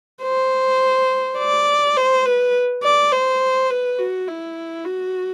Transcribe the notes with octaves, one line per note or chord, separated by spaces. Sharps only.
C5
D5
C5
B4
D5
C5
B4
F#4
E4
F#4